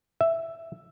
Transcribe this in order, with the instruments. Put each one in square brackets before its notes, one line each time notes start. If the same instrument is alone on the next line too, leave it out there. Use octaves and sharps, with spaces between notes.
[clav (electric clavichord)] E5